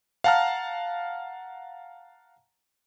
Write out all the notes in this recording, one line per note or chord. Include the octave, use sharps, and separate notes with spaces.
F5 F#5 A5 A#5 F6